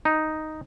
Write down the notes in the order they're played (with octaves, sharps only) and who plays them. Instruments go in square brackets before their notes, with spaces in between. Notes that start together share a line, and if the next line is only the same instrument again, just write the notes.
[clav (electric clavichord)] D#4